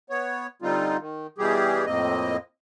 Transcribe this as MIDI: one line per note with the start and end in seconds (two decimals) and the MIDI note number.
0.10 0.47 59
0.10 0.47 73
0.62 0.97 50
0.62 0.97 55
0.62 0.97 60
0.62 0.97 63
0.62 0.97 65
1.00 1.27 51
1.38 1.85 47
1.38 1.85 52
1.38 1.85 55
1.38 1.85 67
1.38 1.85 68
1.86 2.37 41
1.86 2.37 45
1.86 2.37 58
1.86 2.37 60
1.86 2.37 75